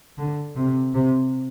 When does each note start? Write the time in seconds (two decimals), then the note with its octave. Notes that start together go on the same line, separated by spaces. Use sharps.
0.18 D3
0.56 C3
0.94 C3